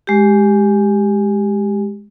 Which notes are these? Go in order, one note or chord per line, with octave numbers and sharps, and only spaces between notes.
G#3 G4